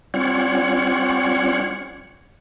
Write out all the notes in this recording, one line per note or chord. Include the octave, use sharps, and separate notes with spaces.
G3 C4 C#4 F4 C#5 F#5